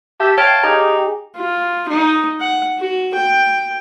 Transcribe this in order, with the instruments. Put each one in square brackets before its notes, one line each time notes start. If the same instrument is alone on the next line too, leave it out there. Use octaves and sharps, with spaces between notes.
[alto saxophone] G4 [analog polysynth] E5 [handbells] A5
[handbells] C#5 F6 D7 [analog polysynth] F5 G5 [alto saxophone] A5
[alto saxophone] D#4 [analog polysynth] G4 G#4 [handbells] A#5
[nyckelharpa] F4
D#4
F#5
F#4
G5